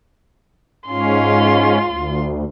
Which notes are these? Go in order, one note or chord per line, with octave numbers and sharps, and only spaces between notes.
G#2 C#4 F4 C6
D2